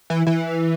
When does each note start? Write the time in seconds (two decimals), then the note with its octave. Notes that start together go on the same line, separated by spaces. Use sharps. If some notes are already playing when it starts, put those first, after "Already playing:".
0.10 E3
0.27 E3